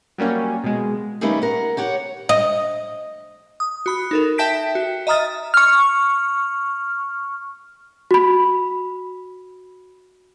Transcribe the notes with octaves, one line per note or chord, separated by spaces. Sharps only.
F#3 G3 A#3 C#4
B2 G#3
D#3 G3 A3 A#3 C#4 B4
A#4 F#5
G4 C#5 F#5
D#5
D#6
F#4 B5 F#6
D#4 A4 A#4
E5 G5 A5 G6 B6 D7
F#4
D#5 E5 A#5 D#6 F6 A6
C#6 F6
F#4 B5